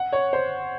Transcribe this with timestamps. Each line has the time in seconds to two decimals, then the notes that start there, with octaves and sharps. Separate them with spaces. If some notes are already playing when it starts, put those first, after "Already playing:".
Already playing: F#5
0.12 C#5
0.33 C5